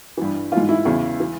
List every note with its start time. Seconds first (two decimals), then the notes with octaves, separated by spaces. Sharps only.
0.17 G2 E3
0.52 G#2 E3 F4
0.69 E4
0.85 E2 C#3 E3
1.20 E3